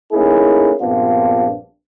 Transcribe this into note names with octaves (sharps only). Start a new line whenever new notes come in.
A3 A#3 C#4 D#4 E4 G#4
A#1 G2 B3 C4 D4 F4